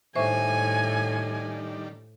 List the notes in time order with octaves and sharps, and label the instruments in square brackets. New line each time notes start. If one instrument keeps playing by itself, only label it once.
[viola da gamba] A2 [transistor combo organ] D#3 G3 D4 [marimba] C5 E5 C#6 [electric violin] G#5